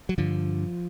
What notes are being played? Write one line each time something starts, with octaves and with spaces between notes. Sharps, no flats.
F#3
G2 D3 F3